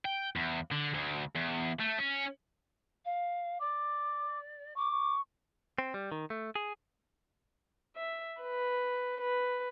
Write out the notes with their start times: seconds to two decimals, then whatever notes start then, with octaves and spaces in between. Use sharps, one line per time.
0.05 G5
0.36 E2
0.72 D3
0.94 D2
1.35 E2
1.80 A3
1.98 C#4
3.05 F5
3.60 D5 D6
4.76 C#6 D6
4.92 C#6
5.78 C4
5.94 G3
6.12 D#3
6.30 A3
6.55 G#4
7.97 E5
8.42 B4
9.20 B4